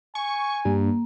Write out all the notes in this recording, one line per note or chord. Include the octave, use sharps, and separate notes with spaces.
G#5 C#6
G2 A#3